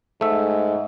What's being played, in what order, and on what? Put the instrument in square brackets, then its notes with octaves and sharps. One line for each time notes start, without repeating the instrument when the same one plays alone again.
[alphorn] G#2 [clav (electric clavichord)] A3 E5